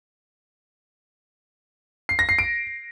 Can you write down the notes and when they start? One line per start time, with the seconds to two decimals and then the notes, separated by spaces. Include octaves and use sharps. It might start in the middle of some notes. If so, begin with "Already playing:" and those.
2.09 C7
2.19 A#6
2.29 C7
2.39 D7